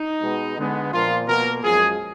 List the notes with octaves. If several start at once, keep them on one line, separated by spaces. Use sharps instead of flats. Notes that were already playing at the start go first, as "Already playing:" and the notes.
Already playing: D#4
B2 G#3 B3
D3 G#3 B3
A#2 F3 A#3 F4
B2 A#3 A#4
F#2 F3 G#3 G#4